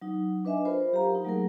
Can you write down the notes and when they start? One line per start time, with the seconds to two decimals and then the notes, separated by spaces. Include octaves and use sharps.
0.02 F#3 D#4
0.45 D4 B4 D#5 E5 G#5
0.65 F4 A#4 C5 B5
0.92 F#3 G4 F5 A#5
1.11 D#4 A#4
1.24 F#3 A3 A#3 G#4 A#4